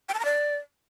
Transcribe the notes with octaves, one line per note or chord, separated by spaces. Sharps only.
G5
A5
A#5
D5